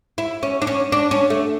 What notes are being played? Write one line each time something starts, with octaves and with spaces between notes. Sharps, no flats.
E4
C#4
D4
C#4
D4
C#4
A3